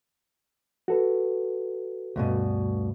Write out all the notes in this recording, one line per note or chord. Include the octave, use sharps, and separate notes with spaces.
F#4 A4 B4
D2 G2 B2